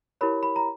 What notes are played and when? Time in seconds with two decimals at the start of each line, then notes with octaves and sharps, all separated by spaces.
0.21 E4 G4 A#4 C#5 B5
0.43 B5
0.56 A#5